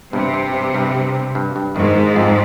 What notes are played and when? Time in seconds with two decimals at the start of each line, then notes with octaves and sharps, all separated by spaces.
0.13 G2 C3
0.34 C4
0.54 G2
0.74 G2
0.95 G2
1.15 C4
1.35 G2
1.56 G2
1.76 G#2 D#3
1.96 G#3
2.16 F2